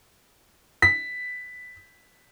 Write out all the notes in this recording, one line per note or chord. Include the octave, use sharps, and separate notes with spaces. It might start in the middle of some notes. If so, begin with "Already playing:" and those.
B6